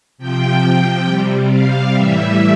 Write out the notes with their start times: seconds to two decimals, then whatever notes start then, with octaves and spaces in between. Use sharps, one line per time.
0.18 C3 F3 G5
1.06 C3 G3
1.50 F5
1.93 A2 E3 G3 E5